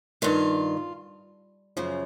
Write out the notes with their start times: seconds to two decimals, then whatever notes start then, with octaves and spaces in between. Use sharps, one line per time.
0.22 G2 D#3 F4
1.77 F#2 C#3 F3